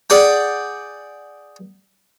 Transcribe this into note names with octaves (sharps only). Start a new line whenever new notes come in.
G#4 D5 F#5 G5